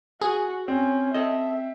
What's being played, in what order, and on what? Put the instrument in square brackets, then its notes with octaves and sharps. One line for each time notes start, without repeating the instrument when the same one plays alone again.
[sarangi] F#4 [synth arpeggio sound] G#4
[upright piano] C4 [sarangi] C#4
[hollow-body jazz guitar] A4 D#5 [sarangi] E5